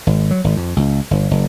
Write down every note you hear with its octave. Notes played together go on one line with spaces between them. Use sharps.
G#1
F#3
G#1
F2
C#2
G1
F#1